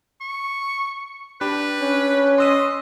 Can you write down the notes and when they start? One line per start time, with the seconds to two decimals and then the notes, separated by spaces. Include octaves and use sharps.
0.21 C#6
1.41 D4 G4 B4 B5
1.81 C#4
2.38 D#5 C6 E6 D#7